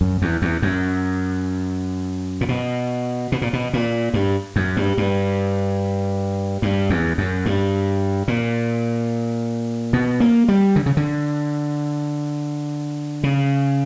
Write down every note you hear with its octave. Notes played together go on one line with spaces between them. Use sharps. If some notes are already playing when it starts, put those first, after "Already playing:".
F#2
E2
E2
F#2
A#2
B2
B2
A#2
B2
A#2
G2
F#2
G2
G2
G2
E2
F#2
G2
A#2
B2
A#3
G3
D3
C#3
D3
C#3